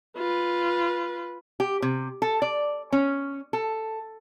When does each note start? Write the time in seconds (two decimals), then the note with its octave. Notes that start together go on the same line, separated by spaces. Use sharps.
0.17 F4 B4
1.60 G4
1.82 C3
2.22 A4
2.42 D5
2.92 C#4
3.53 A4